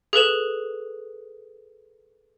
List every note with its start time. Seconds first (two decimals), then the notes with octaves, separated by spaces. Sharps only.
0.13 G#4 A4 B4 E7